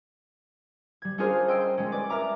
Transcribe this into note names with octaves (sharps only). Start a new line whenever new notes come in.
G3 G#6
C#4 D4 F4 G#4 A#4 C5
D#5 G5 C6 E6 G#6 D7
G#3 C#4
B4 D5 D6
A#4 E5 A#5 D6